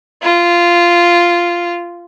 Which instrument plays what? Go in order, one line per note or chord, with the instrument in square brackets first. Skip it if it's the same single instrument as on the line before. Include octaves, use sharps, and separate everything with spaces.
[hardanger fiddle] F4